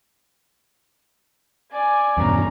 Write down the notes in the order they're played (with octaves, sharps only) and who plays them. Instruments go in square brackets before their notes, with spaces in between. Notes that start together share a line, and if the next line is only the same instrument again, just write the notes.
[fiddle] D5 [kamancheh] G#5
[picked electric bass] E2 G2 B2 [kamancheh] C#4 A#5